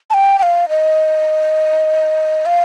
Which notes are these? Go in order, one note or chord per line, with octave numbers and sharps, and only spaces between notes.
A5
G5
G5
F5
D#5
F5